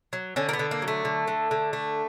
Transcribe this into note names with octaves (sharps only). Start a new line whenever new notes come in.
F#3
D3 C#4
A#3
B3
D3
A#3
F#3
A3
D3
D3
D3
A3